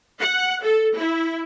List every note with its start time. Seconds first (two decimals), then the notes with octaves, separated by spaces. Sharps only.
0.20 F#5
0.64 A4
0.97 E4